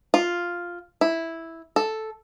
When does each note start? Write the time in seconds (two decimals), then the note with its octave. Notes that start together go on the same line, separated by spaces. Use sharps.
0.14 F4
1.01 E4
1.76 A4